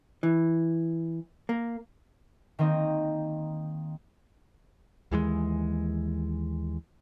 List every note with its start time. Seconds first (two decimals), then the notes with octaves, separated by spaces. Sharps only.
0.23 E3
1.49 A#3
2.59 D#3 A#3 C4 D#5
5.12 D#2 E3 G3 G#3